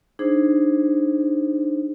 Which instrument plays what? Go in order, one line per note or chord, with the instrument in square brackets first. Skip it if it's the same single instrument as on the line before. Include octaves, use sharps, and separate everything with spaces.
[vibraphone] D4 D#4 G#4 C5